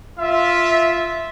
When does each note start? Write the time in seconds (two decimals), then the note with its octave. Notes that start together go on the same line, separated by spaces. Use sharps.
0.18 F4 E5